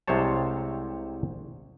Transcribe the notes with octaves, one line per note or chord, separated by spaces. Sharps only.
C2 C3 G#3 C5 C#5 A5